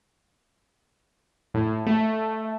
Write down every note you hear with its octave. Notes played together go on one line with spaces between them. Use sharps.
A2
A3